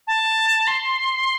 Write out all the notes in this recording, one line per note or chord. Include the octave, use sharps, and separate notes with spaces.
A5
C6